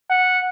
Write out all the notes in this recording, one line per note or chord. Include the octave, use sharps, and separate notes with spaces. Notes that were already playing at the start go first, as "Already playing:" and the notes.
F#5